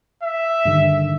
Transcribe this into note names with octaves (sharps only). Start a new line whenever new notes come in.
E5
G2 D3 D#3